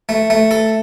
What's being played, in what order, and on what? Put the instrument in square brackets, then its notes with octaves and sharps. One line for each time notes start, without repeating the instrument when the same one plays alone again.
[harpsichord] A3
A3
A4